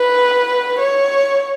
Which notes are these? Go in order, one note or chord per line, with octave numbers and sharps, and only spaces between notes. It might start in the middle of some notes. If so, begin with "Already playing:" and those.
Already playing: B4
C#5